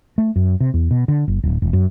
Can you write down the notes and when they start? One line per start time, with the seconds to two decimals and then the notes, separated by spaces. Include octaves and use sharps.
0.18 A3
0.36 F#2
0.60 C3
0.74 E2
0.91 B2
1.08 D3
1.28 F#1
1.43 D1
1.62 E1
1.73 F#2